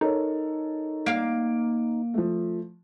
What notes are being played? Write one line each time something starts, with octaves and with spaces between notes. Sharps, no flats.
D#4 A4 A#4 C#5
A#3 F5 D7
F3 A3